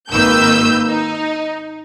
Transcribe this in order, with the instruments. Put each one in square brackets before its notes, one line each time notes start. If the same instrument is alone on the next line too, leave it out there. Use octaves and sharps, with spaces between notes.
[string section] G#1 D#3 A#3 B4 E6 G6
D#4